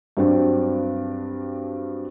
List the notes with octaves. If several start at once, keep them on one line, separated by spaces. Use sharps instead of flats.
G2 F#3 C4 D4